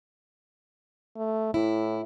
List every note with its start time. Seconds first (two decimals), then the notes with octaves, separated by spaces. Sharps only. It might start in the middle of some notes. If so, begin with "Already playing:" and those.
1.16 A3
1.54 A2 E4